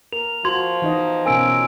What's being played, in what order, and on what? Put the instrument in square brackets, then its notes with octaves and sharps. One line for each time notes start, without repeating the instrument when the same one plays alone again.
[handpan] A#4 [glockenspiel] F7
[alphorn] F3 [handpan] F#4 [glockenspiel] C6 G#6
[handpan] E3 D#4 D#5
[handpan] B2 C#4 A#4 [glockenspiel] G#5 E6 D7